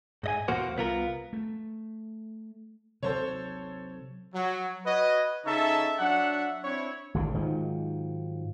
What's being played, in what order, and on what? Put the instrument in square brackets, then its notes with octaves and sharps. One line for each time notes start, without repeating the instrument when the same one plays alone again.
[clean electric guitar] G#2 D#5 G#5
E2 B2 A#3 F#4 C5
C2 B3 F4 A#4
[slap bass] A3
[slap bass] C3 F#3 [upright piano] A4 C5 C#5
[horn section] F#3
F#4 B4 C#5 D#5
C#3 D#4 A4 C#5 E5 A5
F#3 D4 E5 F#5
C4 D4 E4 C#5
[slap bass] G#1 D2 A2 D3
G#2 D#3 F3 F#3